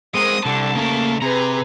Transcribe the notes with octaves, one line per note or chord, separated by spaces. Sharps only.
G#3 C4 A#4 D#6
C2 D3 A5
C#3 A3 A#3 A#5
C3 G#4 B4 A#5